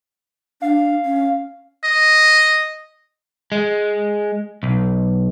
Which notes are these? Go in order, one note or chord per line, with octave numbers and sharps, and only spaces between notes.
D4 F5
C#4
D#5
G#3
B1